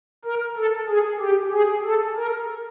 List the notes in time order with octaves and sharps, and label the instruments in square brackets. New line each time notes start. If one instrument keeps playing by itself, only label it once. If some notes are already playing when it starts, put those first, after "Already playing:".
[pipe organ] A#4
A4
G#4
G4
G#4
A4
A#4